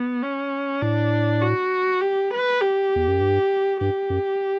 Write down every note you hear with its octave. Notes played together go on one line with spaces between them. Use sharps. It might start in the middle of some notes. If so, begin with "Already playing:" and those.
Already playing: B3
C#4
A2 D4
F#4
G4
B4
G4
E2
F#2
G2
G2 G4
F#2